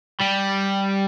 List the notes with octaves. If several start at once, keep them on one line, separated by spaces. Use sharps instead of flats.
G3